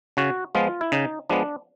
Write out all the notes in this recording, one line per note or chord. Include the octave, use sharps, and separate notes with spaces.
C#3 F#4
F3 G#3 B3 F4
E4
C#3 D#4
F3 G#3 B3 D4